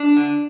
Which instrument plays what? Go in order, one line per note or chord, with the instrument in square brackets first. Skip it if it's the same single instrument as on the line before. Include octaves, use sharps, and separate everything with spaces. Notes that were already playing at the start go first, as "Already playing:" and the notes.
Already playing: [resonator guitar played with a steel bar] D4
D3